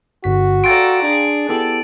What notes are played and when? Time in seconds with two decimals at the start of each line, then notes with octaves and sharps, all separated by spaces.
0.24 G1 F#4 B6
0.64 A4 D5 F5 G5 A#5 C6 A6 D7
1.03 D4 G#4
1.49 B3 E4 G4 A4 D5